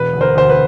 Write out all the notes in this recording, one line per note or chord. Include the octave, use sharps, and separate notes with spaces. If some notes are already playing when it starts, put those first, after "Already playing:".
Already playing: E1 B4
D2
A#4 C5
D2 C5
B4